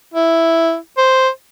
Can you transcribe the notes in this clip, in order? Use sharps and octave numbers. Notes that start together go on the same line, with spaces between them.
E4
C5